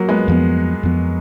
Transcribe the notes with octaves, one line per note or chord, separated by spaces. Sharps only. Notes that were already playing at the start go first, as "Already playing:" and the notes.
Already playing: F#3 A#3
G#3 B3
F2 F3 B3
F2 F3 B3